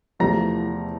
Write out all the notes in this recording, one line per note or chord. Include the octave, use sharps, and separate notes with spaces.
E2 C3 F3 A3 A#5 A#6